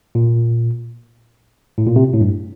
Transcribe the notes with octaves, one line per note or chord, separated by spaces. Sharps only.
A#2
A2
A#2
C3
A2
G2